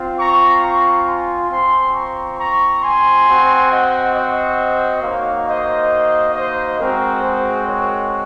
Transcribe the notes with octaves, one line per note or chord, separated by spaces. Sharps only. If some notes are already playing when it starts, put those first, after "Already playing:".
Already playing: C4 F4
A#5 C#6
A#5 C#6
G#5 C6
C4 F4 G#5 C6
A#5 C#6
A#5 C#6
G#5 C6
C4 F#4
D#5 F#5
C5 D#5
A#3 D#4 F#4 C#5 F5
C5 D#5
C5 D#5
G#3 C4 F#4 A#4
G#4 C5
A#4 C#5